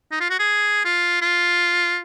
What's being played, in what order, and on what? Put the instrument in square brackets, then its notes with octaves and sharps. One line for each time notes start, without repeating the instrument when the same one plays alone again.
[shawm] D#4
F4
F#4
G#4
F4
F4